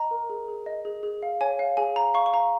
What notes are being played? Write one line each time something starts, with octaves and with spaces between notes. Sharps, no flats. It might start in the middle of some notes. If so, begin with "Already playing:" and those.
Already playing: D#5 A#5
A#4
G#4
G#4
D#5
G#4
G#4
F5
C#5 G#5
F5
G#4 G#5
F5 A#5
F5 C#6
C#6
F5 A#5